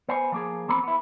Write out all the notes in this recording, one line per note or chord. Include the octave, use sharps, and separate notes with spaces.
B3 C5 G#5
F3 A#3 G#4
E2 A#3 C4 B5
B3 E4